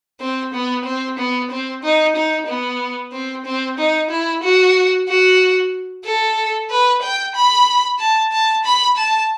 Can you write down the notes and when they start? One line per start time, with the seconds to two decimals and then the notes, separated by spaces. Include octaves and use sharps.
0.20 C4
0.54 B3
0.85 C4
1.19 B3
1.50 C4
1.83 D#4
2.16 D#4
2.47 B3
3.12 C4
3.45 C4
3.78 D#4
4.10 E4
4.43 F#4
5.08 F#4
6.04 A4
6.70 B4
7.02 G5
7.35 B5
7.99 A5
8.32 A5
8.64 B5
8.96 A5